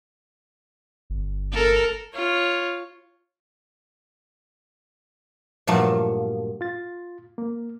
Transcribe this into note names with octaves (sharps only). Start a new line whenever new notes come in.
G1
A4 A#4
F4 C#5
G2 A#2 F3 F#3 A3
F4 A6
A#3